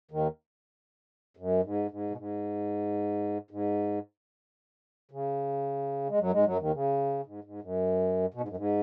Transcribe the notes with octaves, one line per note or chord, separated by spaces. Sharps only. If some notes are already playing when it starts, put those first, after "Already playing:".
D#2 D#3
F#2
G#2
G#2
B2
G#2
G#2
C#3
G#3
F#2 F#3
G#2 G#3
F#2 F#3
D#2 D#3
C#3
G#2
G#2
F#2
B2
G#2
F#2
G#2